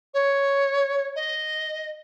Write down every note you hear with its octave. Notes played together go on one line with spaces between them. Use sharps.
C#5
D#5